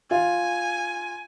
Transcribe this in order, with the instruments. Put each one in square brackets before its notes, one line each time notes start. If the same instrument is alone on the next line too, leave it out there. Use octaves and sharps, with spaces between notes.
[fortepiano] F4 [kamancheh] G#5